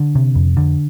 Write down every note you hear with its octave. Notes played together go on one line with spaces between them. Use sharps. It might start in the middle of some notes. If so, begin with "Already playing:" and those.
Already playing: D3
C3
F2
D3